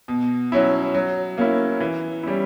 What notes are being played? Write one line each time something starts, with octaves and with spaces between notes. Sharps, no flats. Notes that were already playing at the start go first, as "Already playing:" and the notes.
B2
F#3 C#4 E4
F#3
A#3 C#4 E4
E3
G3 C#4 E4